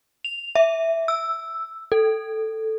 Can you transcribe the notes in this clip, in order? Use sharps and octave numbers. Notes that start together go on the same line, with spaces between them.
F7
E5
E6
A4